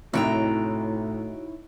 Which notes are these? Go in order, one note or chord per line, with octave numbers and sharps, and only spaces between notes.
C2 A2 D#4 E4 F#4 C#5 G5 A#5